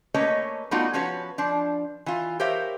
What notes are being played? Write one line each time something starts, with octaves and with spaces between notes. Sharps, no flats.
A3 A#3 C#4 B4 C#5 D#5
G3 A3 B3 D#4 F4 F#4
F3 C#4 F#4 B4 C#5
F3 D4
E3 F4
G4 A#4 C5 C#5 E5 F5